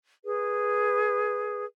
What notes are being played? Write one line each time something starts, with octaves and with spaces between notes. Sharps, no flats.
G#4 B4